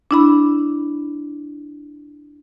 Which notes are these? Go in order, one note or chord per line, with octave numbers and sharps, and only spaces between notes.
D4 E4 B5